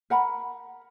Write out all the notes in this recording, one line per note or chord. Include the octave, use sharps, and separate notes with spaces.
A#4 F#5 A#5 B5